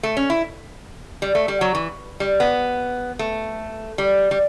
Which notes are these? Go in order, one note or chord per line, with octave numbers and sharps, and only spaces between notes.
A3
C#4
E4
G3
A3
G3
F#3
E3
G3
B3
A3
G3
G3